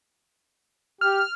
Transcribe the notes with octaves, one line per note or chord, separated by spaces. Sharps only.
G4 F6